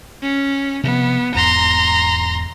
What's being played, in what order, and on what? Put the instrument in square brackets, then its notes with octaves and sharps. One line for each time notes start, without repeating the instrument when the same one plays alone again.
[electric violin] C#4
[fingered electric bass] C3 F3 [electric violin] B3
[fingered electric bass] E1 E2 G#2 [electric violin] A#5 C6